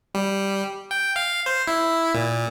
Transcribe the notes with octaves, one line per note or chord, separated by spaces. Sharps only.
G3
G5
F5
C5
E4
A#2